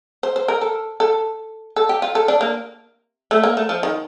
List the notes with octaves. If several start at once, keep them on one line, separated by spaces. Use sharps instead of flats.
C5
C5
A#4
A4
A4
A4
G4
F4
A4
D4
A#3
A3
A#3
A3
F3
D#3